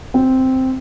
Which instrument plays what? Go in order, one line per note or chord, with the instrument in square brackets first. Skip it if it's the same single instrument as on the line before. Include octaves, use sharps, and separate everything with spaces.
[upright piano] C4